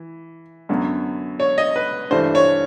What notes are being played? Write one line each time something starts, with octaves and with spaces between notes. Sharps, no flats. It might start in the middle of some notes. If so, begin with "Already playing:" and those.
Already playing: E3
F#2 D3 F#3 B3
C#5
D#5
B4
G2 E3 A3 D4 C5
C#5